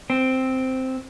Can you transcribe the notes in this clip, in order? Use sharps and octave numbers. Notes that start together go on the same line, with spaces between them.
C4